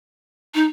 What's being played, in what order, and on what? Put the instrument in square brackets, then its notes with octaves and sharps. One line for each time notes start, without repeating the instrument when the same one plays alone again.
[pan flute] D#4